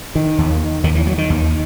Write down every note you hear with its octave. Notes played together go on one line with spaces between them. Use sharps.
D#3
D#2
D#2 D#3
E3
F#3
D#3
D#2